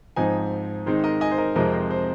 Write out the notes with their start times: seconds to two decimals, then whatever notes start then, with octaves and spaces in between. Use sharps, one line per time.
0.16 G#2 F3 C4 D#4 D#5 G#5
0.86 D#3 G#3 C4 D#4 C5
1.04 A#4 D#5
1.21 D#5 G#5
1.31 C5
1.38 A#4 D#5
1.55 F2 C3 F3 G#3 C4 A#4 D#5
1.73 C5
1.91 C5